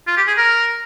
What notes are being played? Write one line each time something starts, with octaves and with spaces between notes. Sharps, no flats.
F4
G4
G#4
A#4